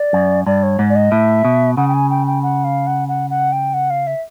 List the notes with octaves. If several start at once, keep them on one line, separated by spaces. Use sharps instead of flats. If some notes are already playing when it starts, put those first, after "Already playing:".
Already playing: D5
F#2
G2 D5
C#5
G#2
D5
D#5
A2 E5
B2
C#3 F#5
G5
G#5
G5
G5
F#5
F5
F#5
F#5
F#5
G5
F#5
F5
E5